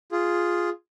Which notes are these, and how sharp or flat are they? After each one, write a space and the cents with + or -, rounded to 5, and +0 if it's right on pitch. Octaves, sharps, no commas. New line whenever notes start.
F4 +0 G#4 +0